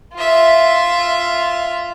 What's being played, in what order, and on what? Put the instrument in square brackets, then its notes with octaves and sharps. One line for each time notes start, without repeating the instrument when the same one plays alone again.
[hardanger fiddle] F4 E5